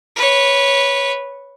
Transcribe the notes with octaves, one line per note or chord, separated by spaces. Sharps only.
B4 C#5